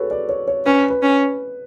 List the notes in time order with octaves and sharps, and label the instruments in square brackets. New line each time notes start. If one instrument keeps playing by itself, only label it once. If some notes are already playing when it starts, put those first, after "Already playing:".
Already playing: [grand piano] F#4 G#4 A4 B4 C#5
D5
C#5
C#5
[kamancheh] C#4 [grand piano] B4
[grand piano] B4
[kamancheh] C#4